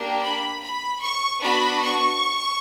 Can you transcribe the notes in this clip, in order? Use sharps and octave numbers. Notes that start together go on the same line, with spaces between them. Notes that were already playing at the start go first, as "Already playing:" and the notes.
Already playing: A#3 D4 G4
B5
B5
C#6
B3 D4 F#4 B5
C#6